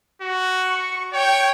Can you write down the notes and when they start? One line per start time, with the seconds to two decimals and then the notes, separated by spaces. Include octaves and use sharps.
0.22 F#4
0.67 C#6
1.13 C#5 G5